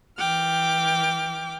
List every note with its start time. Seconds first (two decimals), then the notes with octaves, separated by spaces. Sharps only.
0.17 E3 G5 D6 F6